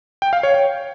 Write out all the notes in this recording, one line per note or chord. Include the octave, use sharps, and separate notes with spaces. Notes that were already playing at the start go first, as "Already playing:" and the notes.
G5
F5
C#5
G5